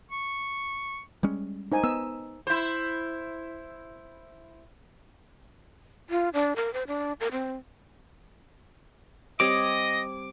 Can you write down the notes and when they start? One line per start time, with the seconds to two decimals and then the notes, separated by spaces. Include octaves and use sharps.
0.11 C#6
1.23 G3 G#3 C#4
1.72 D#4 C5 G#5
1.84 B3 E6
2.47 E4 C5
6.10 F4
6.34 D4
6.56 A#4
6.74 C5
6.88 D4
7.20 A#4
7.32 C4
9.40 G3 C4 C#5 D#5 D6